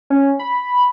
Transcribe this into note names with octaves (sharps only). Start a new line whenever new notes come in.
C#4
B5